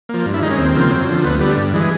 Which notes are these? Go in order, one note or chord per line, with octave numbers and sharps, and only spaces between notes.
F3 A#3
G2
E4
D#3 G#3 D#4
C#4
D#2 C4
C#3 F3 A#3
F#2
D3 F3
D2 B3
D3 G3 B3
G2
E3 G#3